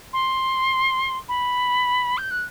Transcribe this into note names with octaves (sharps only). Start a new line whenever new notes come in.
C6
B5
G6
F#6